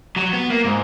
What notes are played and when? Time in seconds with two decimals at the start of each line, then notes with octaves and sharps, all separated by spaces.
0.16 F#3
0.33 B3
0.50 A#3
0.65 G#2